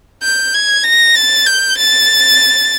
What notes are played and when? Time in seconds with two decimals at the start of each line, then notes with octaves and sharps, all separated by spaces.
0.23 G6
0.54 G#6
0.84 A#6
1.15 A6
1.47 G6
1.77 A6